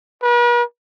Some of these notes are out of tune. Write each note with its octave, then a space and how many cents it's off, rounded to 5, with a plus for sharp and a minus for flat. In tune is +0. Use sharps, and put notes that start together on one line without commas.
B4 -45